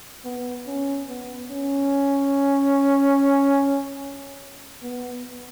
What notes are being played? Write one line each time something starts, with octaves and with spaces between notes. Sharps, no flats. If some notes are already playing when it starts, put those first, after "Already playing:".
B3
C#4
B3
C#4
B3